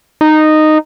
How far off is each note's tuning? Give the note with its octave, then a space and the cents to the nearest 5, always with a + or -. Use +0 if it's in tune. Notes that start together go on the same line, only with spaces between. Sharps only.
D#4 -10